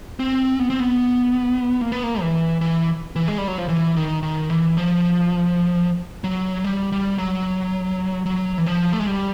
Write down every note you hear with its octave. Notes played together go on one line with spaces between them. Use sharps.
C4
B3
C4
B3
A#3
B3
A#3
E3
E3
E3
G#3
G3
F#3
F3
E3
D#3
D#3
E3
F3
F#3
G3
G3
F#3
F#3
E3
F3
A3
G#3
G3